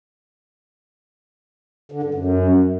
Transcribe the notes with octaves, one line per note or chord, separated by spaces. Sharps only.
D3
G2
F#2